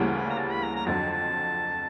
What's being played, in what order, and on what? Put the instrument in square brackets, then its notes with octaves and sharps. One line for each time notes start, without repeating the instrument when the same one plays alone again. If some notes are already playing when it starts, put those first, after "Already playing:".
Already playing: [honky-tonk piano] D2 C#3 E3 G3 A#3
[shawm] G#5
A#5
A5
B5
A#5
A#5
[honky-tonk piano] F2 D3 F#3 [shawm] A5
[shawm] A5